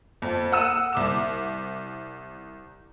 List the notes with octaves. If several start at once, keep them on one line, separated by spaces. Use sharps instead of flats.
F2
F#5 D#6 E6 D#7 E7
C2 D6 E7